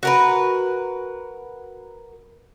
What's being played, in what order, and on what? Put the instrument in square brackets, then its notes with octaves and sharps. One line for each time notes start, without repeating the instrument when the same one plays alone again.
[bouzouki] F#4 A#4 B4